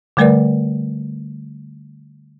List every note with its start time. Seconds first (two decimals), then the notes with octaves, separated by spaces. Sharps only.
0.17 D3 G3 A3 A#4 B4 D5